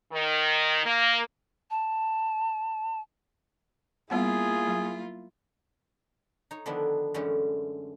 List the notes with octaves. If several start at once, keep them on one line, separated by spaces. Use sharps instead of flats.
D#3
A#3
A5
G3 A#3 B3 E4 F4 G#4 F#5
F#3
D#4 C#5
D3 D#3 F3 B3 D4 E4
F#2 D3 E3 G#3 A3 C#4